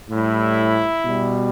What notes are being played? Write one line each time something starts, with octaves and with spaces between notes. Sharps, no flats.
A2 G3 E4
B2 G3